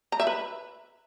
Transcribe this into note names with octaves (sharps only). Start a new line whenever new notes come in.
A#5
E5
B4